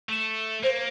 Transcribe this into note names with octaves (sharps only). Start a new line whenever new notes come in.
A3
A#3 C5